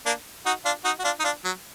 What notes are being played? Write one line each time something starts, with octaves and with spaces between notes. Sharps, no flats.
A#3 D4
D#4 F#4
D4 F4
D#4 F#4
F#4
D4 F4
D#4
D4 F4
F#3